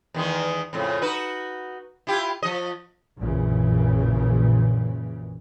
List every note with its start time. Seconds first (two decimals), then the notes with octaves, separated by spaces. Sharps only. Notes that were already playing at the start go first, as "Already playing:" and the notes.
0.14 E2 D#3 G#3
0.73 F2 A2 C#3
1.02 D#4 F#4 B4
2.07 E4 F4 G4
2.43 F3 D#5
3.19 A#1 F#2 A#2 C#3 E3